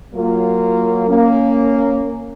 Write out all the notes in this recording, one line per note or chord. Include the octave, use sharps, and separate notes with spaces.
F#3 A#3 F4
A#3 C#4